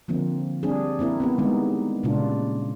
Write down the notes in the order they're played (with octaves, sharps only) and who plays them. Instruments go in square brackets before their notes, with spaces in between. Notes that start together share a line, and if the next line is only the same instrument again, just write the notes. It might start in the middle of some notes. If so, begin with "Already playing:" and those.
[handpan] D3 F3 A#3 C4
G3 C4 D4 G#4
A#3 C4 E4 A#4
B3 C4 G4
D#3 G3 G#3 B3 D#4
A#2 C#3 G#3 D4 F4